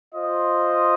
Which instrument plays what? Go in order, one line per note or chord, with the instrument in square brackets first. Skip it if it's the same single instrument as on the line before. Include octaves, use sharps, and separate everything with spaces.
[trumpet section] F4 C5 D#5